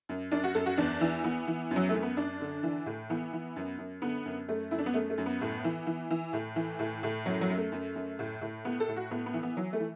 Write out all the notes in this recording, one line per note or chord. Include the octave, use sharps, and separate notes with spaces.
F#2
F#2 D4
F#4
F#2 A4
F#4
E2 D4
E3
E3 B3
E3
F#2
F#3
A3
F#2
B3
F#2 D4
D3
E3
A2
E3 B3
E3
F#2
F#2
D3 B3
F#2
F#2 A3
F#2 E4
D4
B3
F#2 A3
A3
F#2
B3
A2
E3
E3
E3
A2
E3
A2
A2
F#2 F#3
F#3
F#2
A3
F#2
F#2
A2
A2
A2 B3
A4
A2
F#4
A2 B3
B3
E3
B3
E3 F#3
A3
E3